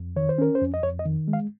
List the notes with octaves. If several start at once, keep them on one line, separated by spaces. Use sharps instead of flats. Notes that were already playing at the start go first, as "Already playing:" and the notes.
Already playing: F2
D#3 C#5
C5
C#4 A#4
C5
F2
D#5
F2 C#5
D#5
D#3
G#3
F5